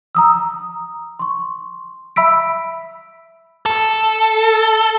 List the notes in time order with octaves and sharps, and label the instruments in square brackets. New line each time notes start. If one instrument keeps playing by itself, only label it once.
[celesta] A#5 D#6 E6
C6 C#6
E5 B5 E6 B6 D7
[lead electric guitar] A4